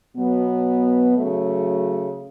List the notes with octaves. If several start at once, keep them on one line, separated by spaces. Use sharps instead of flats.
B2 F#3 B3
C#3 F#3 A3